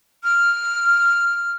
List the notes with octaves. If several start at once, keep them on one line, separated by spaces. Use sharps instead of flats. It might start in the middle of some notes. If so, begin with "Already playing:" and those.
F6